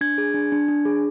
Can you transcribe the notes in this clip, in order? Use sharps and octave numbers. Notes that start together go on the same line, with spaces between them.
D4 G#6
G#4
D4
D4
D4
G#4